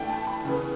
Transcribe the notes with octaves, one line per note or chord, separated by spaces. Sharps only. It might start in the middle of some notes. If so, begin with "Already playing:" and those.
Already playing: A2 E3 A3 D4 G5
A5
B5
C#3 E3 B3